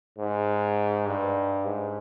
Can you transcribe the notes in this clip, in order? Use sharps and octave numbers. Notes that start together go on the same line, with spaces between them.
G#2
G2
G#2